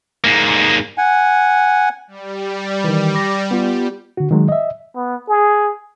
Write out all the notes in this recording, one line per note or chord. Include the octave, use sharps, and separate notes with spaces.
G#2 A#3
F#5 G#5
G3
D#3 E3
D6 A#6
B3 F4 G4
D3 F#4
D#3 F#3 G#3
D#5 E5
B3
G#4